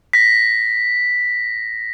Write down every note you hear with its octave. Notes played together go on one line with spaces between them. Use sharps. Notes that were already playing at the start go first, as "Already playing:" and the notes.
A#6 B6